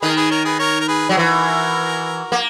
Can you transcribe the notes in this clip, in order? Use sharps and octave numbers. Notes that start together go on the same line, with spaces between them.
D#3 G#4 B4
A#4
G#4 B4
A#4 C#5
G#4 B4
A#4 C#5
A#4
G#4 B4
F#3 G#4
E3 F#4 A#4
A#3